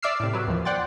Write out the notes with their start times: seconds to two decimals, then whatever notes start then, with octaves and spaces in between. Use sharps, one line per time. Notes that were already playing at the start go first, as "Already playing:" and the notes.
0.02 D5 E5 D6 E6 F6 C7
0.20 A2 C3
0.33 F#3 B4
0.47 D#2 E3 F3
0.65 D5 F#5 G5 C6 A6